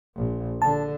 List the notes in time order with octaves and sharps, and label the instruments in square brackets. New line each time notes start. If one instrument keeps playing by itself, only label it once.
[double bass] A#1
[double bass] D3 [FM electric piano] A5